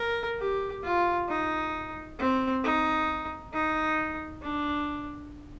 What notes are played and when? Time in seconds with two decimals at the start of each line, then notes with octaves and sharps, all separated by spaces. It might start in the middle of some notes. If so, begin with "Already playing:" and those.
Already playing: A#4
0.40 G4
0.83 F4
1.29 D#4
2.19 C4
2.64 D#4
3.53 D#4
4.42 D4